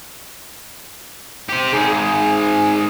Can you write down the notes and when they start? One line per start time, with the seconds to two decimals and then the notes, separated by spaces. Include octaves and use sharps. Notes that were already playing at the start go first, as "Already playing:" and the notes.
1.49 G4 C5
1.72 G#2 D#3 G#4